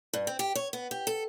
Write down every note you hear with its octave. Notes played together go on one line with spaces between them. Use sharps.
G2
C4
G4
C#5
B3
G4
A4